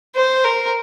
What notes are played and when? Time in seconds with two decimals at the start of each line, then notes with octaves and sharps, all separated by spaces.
0.15 C5
0.44 A#4